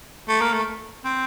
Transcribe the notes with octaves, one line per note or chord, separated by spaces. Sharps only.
A3
A#3
A3
C4